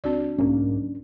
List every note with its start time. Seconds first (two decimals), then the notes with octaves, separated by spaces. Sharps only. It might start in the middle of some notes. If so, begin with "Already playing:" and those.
0.04 C#2 C4 D4 F#4 D5
0.38 B1 G#2 A#3 C#4